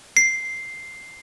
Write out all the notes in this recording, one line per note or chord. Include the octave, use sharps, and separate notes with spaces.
C7